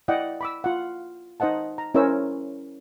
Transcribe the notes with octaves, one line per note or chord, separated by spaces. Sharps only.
E4 D5 D#5 F#5 G5
B5 D6 E6
F4 F#5
D#4 C5 D#5 F#5 A5
A#5
C#4 E4 A#4 C5 C#5 E6